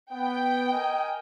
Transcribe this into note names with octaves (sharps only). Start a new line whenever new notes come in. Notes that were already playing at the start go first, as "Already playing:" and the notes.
B3 G5
A#4 D#5 G#5